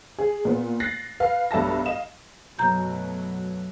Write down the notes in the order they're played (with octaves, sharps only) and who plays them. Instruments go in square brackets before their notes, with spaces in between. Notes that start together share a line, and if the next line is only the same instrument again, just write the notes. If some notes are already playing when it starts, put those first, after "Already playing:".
[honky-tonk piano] G#4
A#2 B3
F#6 A6 A#6 C7
B4 F5
B1 G2 A4 E5 A5 A#6
D#5 F5 E7
[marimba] F#2 A#5 G6 [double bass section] B2 F#3 A3